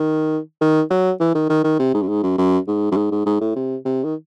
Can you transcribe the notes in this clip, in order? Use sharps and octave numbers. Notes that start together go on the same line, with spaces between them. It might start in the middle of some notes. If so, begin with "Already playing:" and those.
Already playing: D#3
D#3
F#3
E3
D#3
D#3
D#3
C3
G#2
F#2
G#2
F#2
F#2
G#2
F#2
G#2
G#2
G#2
A2
C3
C3
D#3